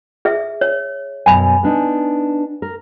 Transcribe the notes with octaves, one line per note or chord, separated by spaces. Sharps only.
G#4 E5
C#5
F#2 B2 G#5 B5
B3 D4 D#4
A#4